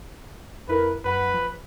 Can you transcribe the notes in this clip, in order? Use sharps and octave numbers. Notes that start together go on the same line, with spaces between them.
F2 E4 A#4 B4
F#2 B4 F#5 B5
F3